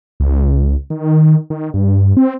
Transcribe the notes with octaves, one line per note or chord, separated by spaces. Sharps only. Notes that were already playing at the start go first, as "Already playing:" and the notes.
C#2
D#3
D#3
G2
C4